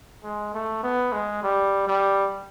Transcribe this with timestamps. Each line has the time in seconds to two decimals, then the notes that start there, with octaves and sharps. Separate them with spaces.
0.23 G#3
0.54 A3
0.83 B3
1.12 G#3
1.43 G3
1.87 G3